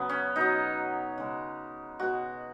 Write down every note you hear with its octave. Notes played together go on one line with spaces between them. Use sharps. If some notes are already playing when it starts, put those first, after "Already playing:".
Already playing: C#3 F#3 B3
C#4
B2 F#3 D#4
C#3 G#3
B2 G#3 F#4